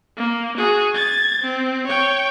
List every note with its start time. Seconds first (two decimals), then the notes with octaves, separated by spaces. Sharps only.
0.17 A#3
0.57 F#4 G#4
0.94 G#6 A6
1.42 C4
1.87 C#5 G5